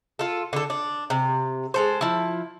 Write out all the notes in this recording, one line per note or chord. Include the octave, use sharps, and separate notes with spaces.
F4 A4
D3 A4
D4
C3
G#3 A4 C5
F3 E4